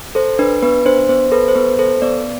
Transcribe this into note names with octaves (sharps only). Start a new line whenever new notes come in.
A4 C5
D4 B4
B3 B4
D4 C5
B3 C5
A4 B4
C5
B3 B4
A4 C5
B3 D5